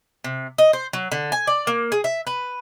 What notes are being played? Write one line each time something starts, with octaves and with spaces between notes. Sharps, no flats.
C3
D#5
C5
F#3
D3
G#5
D5
A#3
G#4
E5
B4